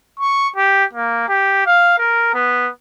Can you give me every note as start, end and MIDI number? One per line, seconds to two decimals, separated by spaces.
0.20 0.49 85
0.56 0.85 67
0.93 1.28 58
1.28 1.64 67
1.66 1.98 77
1.98 2.31 70
2.34 2.70 59